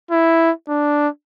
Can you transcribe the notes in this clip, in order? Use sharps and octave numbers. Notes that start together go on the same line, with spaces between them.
E4
D4